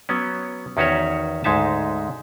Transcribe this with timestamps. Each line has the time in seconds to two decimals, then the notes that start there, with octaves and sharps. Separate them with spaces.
0.09 F#3 B3 C#4
0.77 E2 D#3 C#4 F#4 B4 C#5
1.44 D2 G#2 G#3 D#4 E5 A5